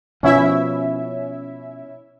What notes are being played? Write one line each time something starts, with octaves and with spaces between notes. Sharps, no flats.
B2 F3 C#4 E4 E5